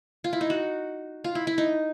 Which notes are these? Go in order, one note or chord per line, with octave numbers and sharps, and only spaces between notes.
F4
E4
D#4
F#4
F4
E4
E4
D#4